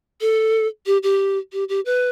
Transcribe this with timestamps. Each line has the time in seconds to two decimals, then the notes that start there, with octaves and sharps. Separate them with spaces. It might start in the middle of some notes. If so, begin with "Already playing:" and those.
0.21 A4
0.86 G4
1.03 G4
1.53 G4
1.69 G4
1.86 B4